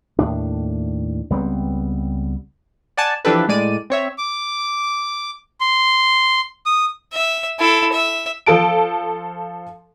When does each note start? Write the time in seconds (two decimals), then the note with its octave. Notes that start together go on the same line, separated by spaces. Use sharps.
0.19 D#2 A2 D4
1.30 C#2 G3 B3 C4
2.97 D5 F#5 G#5 A5
3.25 E3 F3 D4 G4 A4 B4
3.48 A2 G#3 D5 D#7
3.90 C4 C#5 E5
4.18 D6
5.61 C6
6.66 D#6
7.14 E5
7.59 E4 A4
7.93 E5
8.46 F3 A4 A5 D7